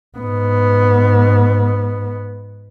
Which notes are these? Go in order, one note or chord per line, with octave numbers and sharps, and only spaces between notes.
G#2 B3